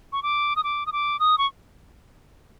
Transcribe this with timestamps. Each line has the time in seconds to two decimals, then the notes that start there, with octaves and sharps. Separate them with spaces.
0.12 C#6
0.23 D6
0.56 D#6
0.63 D6
0.86 D#6
0.92 D6
1.19 D#6
1.38 C#6